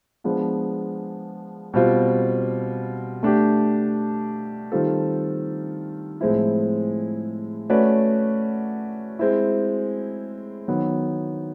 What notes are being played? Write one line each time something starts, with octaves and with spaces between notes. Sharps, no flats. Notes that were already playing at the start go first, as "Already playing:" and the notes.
F3 G#3 B3 D4 F4
B2 G3 C4 F4
A3 D4 G4
D#3 G3 C4 F4 A4
A2 F3 G#3 C4 E4
A3 C#4 F#4 B4 D5
G#3 C4 E4
D#3 F#3 B3